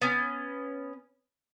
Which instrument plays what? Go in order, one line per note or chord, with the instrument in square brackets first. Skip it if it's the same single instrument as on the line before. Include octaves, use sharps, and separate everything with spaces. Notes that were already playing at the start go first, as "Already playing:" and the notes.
[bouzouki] B3 C#4